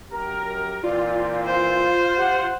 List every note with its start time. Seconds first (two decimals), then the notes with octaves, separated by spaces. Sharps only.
0.12 F#2 G4 A#4 A#5
0.83 A#2 E3 C4 F4 D5
1.46 C5 F5
2.17 G4 F#5